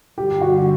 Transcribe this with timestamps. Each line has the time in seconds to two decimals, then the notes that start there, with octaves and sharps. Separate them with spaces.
0.18 G2 D3 G3 G4
0.41 F#4